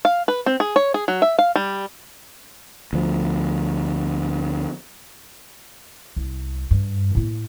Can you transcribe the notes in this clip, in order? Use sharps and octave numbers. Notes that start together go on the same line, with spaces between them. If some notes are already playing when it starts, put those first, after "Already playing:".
F5
B4
C4
G#4
C#5
G#4
F#3
E5
F5
G3
D2 F3
C2
G2
A2 A#3